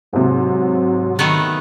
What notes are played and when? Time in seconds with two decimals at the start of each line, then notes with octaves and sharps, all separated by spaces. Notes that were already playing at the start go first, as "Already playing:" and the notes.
0.13 G#2 C3 F#3
1.19 D#3 A3 B3